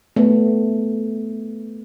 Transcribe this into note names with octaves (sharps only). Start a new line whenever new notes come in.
A3 B3